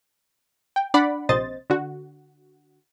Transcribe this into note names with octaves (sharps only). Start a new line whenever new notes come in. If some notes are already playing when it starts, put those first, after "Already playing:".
G5
D4 D5 F#5 B5
A#1 C3 C5 D#5 A6
D3 F#4